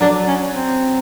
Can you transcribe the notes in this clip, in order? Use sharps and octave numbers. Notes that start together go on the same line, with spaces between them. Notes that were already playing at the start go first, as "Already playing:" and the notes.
F#3 D4
C#4
C4